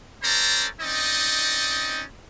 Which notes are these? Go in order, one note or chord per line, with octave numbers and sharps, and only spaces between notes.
C#4 A4 C5 D5 A#5
C4 C#4 D#4 D5 D#5